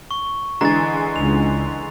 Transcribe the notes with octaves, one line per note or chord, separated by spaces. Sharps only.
C#6
D3 E3 G#3 A#5 A6
C#2 F7